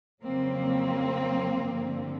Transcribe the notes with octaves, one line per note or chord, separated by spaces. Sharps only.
F2 C#3 F#3 A#3 C4
G2 D3 F3